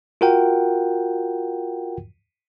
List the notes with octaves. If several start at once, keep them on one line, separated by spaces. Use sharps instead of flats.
F4 F#4 A#4 F#5 G5